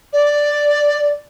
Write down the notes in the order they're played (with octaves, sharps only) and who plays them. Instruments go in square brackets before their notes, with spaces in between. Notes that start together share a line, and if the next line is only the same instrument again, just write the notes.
[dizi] D5